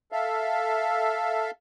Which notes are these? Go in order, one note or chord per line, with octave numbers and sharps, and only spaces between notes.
A4 E5 F5